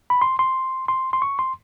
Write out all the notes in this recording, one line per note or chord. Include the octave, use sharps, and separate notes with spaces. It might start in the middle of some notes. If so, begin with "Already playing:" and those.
B5
C6
C6
C6
C6
C#6
C6